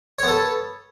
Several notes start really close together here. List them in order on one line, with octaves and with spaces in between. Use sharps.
C#5 B3 A4